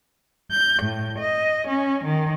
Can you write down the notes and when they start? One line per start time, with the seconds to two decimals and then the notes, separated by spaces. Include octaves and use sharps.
0.51 G6
0.83 A2
1.19 D#5
1.67 C#4
2.05 D#3